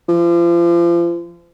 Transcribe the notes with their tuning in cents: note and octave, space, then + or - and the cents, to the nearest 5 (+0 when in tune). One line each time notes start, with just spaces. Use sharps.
F3 -35